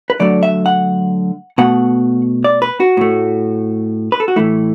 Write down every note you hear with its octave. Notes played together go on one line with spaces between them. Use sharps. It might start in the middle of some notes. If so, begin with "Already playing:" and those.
B4
D3 F#3 A3 D5
E5
F#5
B2 A3 F#5
D5
B4
F#4
A2 A3
B4
A4
F#4
A2 E3 A3 E4